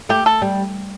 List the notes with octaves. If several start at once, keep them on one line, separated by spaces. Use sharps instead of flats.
A3 G4
A4
G3